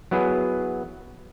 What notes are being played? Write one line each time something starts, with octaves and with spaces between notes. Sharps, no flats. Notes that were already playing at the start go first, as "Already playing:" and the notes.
F#3 B3 E4 G#4 B4